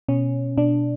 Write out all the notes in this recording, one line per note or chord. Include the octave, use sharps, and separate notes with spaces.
B2 C#4
B2 D4